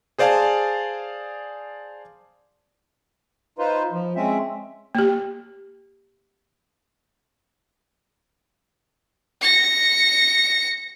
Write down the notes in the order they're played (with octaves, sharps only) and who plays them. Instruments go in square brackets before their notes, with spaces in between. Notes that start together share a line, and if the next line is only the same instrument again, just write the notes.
[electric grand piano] G#4 C5 D5 F5 G#5 A5
[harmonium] D#4 F4 B4 C5
F3
G#3 C4 C#4 E5
[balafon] A#3 G4
[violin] A#6 C#7